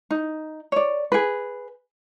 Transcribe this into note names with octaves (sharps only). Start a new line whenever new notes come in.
D#4
C#5 D5
G#4 B4